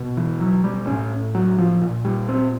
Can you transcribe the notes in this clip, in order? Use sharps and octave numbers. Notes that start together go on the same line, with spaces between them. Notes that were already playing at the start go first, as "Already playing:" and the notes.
Already playing: B2
E3
F#3
G3
A2 C#4
F#3
F3
A#2
G3
C4